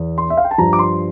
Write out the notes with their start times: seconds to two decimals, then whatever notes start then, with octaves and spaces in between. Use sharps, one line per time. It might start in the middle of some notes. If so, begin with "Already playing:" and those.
Already playing: E2
0.18 C6
0.30 E5
0.37 F5
0.44 G5
0.51 A5
0.58 G2 F3 A#5
0.73 D6
0.79 C6